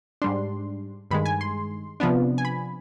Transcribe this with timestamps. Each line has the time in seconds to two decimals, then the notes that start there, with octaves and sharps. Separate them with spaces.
0.22 G#2 G3 D4 C6
1.11 G2 D#3 G#3 B5
1.26 G#5
1.41 C6
2.00 C3 F3 B3 D4
2.38 G#5
2.45 B5